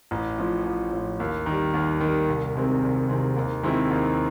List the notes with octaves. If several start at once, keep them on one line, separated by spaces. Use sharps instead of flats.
A1
A2 F3
A1
A2 F3
D#2
D#3 G3
D#2
D#3
G3
C2
C3 D#3 G#3 C4
C2
C3 D#3 G#3 C4
D#2
D#3 G#3 C4 E4
D#2